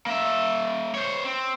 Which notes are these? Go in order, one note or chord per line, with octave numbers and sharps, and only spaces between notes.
A#3 E5
C5 C#5
C4